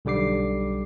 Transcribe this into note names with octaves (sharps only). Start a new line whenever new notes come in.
B1 D3 G3 D6 C7